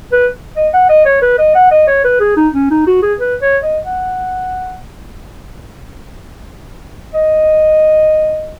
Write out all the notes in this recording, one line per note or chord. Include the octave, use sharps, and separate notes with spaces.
B4
D#5
F#5
D#5
C#5
B4
D#5
F#5
D#5
C#5
B4
G#4
D#4
C#4
D#4
F#4
G#4
B4
C#5
D#5
F#5
D#5